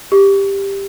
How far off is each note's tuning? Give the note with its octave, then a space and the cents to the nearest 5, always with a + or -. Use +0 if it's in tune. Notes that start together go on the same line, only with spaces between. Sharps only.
G4 +10